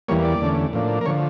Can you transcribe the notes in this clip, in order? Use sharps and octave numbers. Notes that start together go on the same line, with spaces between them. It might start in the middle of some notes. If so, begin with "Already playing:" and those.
E2 E3 G3 A#3 C#5
D5
E2 D3 A3 C#4
A2 F3 A#3 D4
A#4
D3 F3 C#5